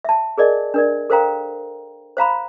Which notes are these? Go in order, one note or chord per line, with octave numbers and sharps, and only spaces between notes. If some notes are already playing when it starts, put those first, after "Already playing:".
E5 A5
G#4 A#4 D5 D#5 G#5
D4 A#4 D5
A4 A#4 C5 F5 G5 A#5
C5 F5 A#5 B5